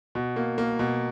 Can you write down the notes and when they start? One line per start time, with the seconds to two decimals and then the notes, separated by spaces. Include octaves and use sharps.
0.15 B2
0.36 A#3
0.58 A#3
0.79 B2